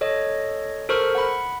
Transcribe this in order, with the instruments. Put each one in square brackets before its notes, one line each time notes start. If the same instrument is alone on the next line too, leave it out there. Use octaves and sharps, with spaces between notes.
[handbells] A4 C#5 D#5
A4 A#4 C5 C#6 F6
F#5 B5